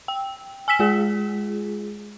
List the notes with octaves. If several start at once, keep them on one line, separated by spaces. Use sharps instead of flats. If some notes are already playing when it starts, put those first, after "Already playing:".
G5
G#5 E6 B6 E7
G#3 F4 G#4